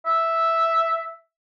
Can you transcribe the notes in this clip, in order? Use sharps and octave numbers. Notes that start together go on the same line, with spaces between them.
E5